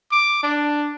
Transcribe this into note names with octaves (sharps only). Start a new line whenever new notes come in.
D6
D4